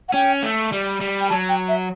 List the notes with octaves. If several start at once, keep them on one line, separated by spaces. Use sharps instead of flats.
F#5
C#4 G5
A3
G3
G3
G5
F#3 A5
G5
E5